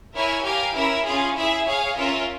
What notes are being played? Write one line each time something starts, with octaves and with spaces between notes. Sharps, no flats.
E4 A#4 C#5 E5 G#5
G4 A#4 F5 G#5
C#4 E4 A#4 E5
C#4 F4 G#4
E4 G#4 E5
G#4 C#5 F5 G#5
C#4 F4 A#4 E5